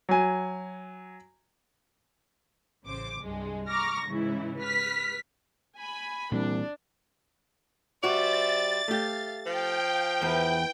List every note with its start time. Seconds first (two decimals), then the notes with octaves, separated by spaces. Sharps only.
0.09 F#3 G#5
2.84 A1 C#3 C5 D6
3.20 C2 G2 G#3
3.68 A#5 C#6 D6 F6 A#6
4.07 G#2 C#3 E3 E4
4.58 B4 F6 B6
5.76 G#5 B5
6.32 C2 A#2 E3 G3 D4
8.04 G3 F#4 C5 D5 E5 A6
8.88 A3 G4 F5
9.46 F3 F5 G5
10.22 E2 E4 B4